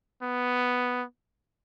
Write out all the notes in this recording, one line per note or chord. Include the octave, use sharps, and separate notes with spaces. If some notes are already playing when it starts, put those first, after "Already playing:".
B3